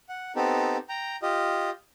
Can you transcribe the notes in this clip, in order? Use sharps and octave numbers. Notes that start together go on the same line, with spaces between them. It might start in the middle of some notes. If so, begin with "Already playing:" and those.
F#5
B3 C4 D#4 G4 A4
G5 A#5
F4 G4 D#5